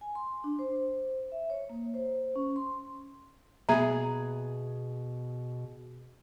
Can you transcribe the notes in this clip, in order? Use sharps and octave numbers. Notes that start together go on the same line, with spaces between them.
G#5
C6
D4
C5
C5
E5
C#5
A#3
C5
C#4
C6
B2 B3 G#4 E5 A#5